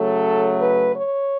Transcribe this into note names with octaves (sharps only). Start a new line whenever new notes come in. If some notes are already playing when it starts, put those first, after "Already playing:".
Already playing: C#3 F#3 A3 A4
B4
C#5